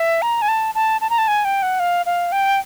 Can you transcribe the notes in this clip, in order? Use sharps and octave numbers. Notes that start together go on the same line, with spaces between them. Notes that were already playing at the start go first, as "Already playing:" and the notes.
Already playing: E5
A#5
G#5
A5
A5
A5
A#5
A5
G#5
G5
F#5
F5
F5
G5